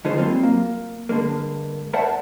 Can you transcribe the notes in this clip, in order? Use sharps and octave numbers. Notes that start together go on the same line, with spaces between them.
D3 G#3 D#4 F4 G#4 C5
F#3 G3 A#3 C4 F4
A#3
G2 D3 G#3 A#3
A#4 C5 D5 E5 F#5 A5